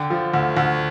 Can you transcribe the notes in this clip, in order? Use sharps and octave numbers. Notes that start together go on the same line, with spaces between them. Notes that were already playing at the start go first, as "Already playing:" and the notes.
Already playing: D3 G5
F3
D2
D2